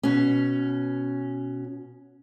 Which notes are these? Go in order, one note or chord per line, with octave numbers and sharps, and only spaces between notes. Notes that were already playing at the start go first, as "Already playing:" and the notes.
B2 C#4